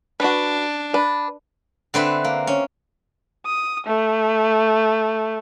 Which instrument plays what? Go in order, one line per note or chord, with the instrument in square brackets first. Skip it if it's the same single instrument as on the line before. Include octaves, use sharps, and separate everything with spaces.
[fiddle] D4 [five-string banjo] F#4 B4
[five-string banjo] D4 [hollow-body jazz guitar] B4
[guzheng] D3 C4 B4 E5
A#3
C#4
[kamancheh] D#6
A3